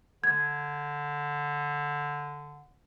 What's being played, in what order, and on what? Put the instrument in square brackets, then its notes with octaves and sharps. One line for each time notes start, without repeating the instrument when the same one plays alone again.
[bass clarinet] D3 [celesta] G#6